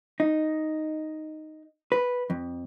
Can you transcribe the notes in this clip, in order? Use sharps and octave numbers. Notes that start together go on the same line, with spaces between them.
D#4
B4
F2